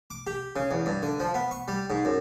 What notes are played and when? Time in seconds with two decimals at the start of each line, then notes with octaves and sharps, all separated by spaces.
0.10 D6
0.27 G4
0.56 C#3
0.71 E2
0.86 G2
1.02 D3
1.20 F3
1.34 B3
1.51 C#6
1.68 G3
1.90 G#2
2.05 F#2